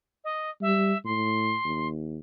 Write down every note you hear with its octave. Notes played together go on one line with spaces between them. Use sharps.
D#5
G3 E5
A2 C6
D#2